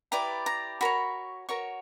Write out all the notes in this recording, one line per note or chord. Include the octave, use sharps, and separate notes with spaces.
E4 G4 B4 D5 A#5
A#5
F#4 A#4 C#5 B5
F#4 A#4 C#5 C#6